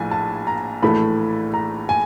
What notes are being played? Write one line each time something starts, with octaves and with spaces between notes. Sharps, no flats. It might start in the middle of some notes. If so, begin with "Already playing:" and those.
Already playing: A#1 A2 F3 G#5
A5
A#5
A#1 A2 E3 A3 B5
A#5
G#5